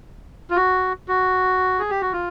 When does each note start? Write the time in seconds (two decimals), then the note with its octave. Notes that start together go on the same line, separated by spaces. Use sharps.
0.50 F4
0.56 F#4
1.08 F#4
1.79 G#4
1.90 G4
2.02 F#4
2.13 F4